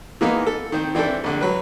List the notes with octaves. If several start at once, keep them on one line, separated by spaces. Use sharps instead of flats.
E3 G#3 A#3 B3 D#4
A4
D#3 C4
E3 C4 D4 E4 A4
A#1 D3
F#3 B4